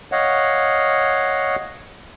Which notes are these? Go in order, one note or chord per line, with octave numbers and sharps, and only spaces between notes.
C#5 D#5 F5 F#5